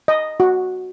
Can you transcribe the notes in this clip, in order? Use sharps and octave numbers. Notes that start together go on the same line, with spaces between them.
D#5
F#4